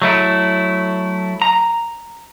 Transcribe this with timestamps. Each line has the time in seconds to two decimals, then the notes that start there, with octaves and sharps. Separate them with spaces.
0.02 F#3 A3 E4
1.42 A#5